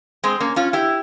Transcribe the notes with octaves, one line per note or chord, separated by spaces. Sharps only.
G#3 C4
A#3 C#4
C#4 F4
E4 G4